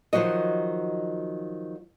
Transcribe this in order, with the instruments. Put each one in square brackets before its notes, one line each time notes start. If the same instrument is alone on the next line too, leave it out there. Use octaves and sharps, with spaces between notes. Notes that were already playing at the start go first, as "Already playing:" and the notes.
[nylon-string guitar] D#3 F3 F#3 F#4 D#5